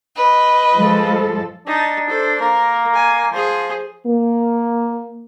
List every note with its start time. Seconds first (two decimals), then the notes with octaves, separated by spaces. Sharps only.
0.16 B4 D#5
0.76 F3 G#3 A4
1.67 D4 D#4 A5
2.08 A4 C5
2.41 A#3 A#4
2.95 G#5
3.32 F3 G#4 C5
4.07 A#3